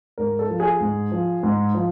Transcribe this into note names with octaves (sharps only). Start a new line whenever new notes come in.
G#2 A#4
A4
F3
G#4
G#2
F3
G#2
F3